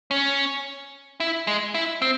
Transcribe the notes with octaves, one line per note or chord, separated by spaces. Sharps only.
C#4
E4
G#3
E4
C4